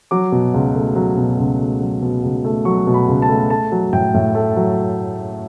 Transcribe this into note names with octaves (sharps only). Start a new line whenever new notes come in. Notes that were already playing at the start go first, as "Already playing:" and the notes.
F#3 D6
B2
C#2
A3
F#3
B2
C#2
A3
F#3
B2
C#2
A3
F#3 C#6
B2
B5
C#2
A5
A3
A3 A5
F#3
A2 G5
A2
A3
F#3